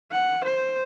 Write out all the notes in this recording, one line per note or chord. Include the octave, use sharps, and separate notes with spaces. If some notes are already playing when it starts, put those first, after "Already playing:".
F#5
C5